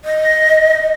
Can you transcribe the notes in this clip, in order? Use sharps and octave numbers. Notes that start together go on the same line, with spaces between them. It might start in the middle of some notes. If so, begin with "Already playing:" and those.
D#5